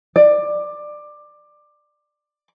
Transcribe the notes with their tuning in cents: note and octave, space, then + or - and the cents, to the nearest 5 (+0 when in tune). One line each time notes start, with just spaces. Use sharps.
D5 +15